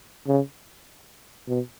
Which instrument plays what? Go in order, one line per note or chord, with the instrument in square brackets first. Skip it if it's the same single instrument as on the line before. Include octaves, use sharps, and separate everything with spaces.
[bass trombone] C#3
B2